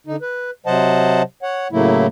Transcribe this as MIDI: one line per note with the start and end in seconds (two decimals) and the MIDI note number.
0.07 0.16 50
0.07 0.16 63
0.22 0.51 71
0.66 1.22 48
0.66 1.22 54
0.66 1.22 72
0.66 1.22 75
0.66 1.22 78
0.66 1.22 81
1.43 1.68 73
1.43 1.68 78
1.72 2.07 45
1.72 2.07 49
1.72 2.07 54
1.72 2.07 57
1.72 2.07 58
1.72 2.07 64